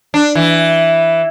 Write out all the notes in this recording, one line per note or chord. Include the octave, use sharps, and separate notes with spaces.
D4
E3